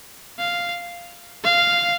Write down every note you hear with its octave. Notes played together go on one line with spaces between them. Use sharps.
F5
F5